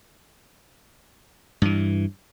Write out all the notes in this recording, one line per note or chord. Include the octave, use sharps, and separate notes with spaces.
G2 E3